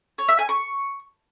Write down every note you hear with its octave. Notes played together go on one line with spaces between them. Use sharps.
C#5
E5
G#5
C#6